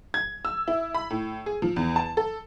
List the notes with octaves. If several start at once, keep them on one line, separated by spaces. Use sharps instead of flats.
G#6
E6
E4
B5
A2
G#4
F3
E2
A5
A4